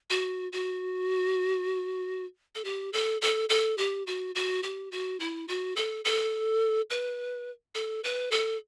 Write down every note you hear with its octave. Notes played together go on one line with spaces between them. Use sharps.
F#4
F#4
A4
G4
A4
A4
A4
G4
F#4
F#4
G4
F#4
E4
F#4
A4
A4
B4
A4
B4
A4